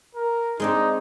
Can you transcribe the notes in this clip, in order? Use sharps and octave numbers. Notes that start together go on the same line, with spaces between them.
A#4
G#3 C4 D4 D#4